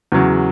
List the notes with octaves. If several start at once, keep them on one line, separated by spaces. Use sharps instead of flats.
E2 C#3 F#3